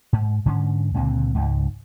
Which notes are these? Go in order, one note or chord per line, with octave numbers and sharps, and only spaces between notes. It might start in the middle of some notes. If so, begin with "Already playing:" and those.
G#2
G#2 D3 C#4
C#2 A#2 D3 C4
C#2 G#2